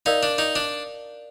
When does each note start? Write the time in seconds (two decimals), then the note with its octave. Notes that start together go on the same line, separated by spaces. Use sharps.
0.06 D#4 A#4 D5 F5
0.23 D4
0.38 D#4
0.56 D4